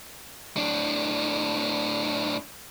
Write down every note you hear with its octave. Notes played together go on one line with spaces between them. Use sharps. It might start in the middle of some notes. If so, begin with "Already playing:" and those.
A2 D4